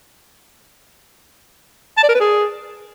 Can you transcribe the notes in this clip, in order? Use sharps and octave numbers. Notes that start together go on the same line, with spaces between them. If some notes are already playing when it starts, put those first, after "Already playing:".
A5
D5
A#4
B4
G#4